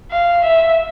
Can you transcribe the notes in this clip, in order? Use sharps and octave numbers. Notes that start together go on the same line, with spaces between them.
F5
E5